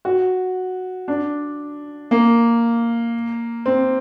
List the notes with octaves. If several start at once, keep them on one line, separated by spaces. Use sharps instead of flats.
F#4
D4
A#3
C4